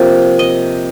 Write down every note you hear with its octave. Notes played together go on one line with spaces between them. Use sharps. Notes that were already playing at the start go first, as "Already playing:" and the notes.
Already playing: C3 F3 A#3
D#5